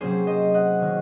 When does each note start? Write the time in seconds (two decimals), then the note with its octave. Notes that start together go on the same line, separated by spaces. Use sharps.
0.01 C3 F#3 A#3 C#4 G#4 C5
0.27 C5 D#5
0.54 D#5 F#5
0.81 D#3 A#3 C#4